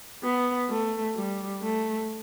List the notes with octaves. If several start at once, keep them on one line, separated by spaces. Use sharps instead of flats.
B3
A3
G3
A3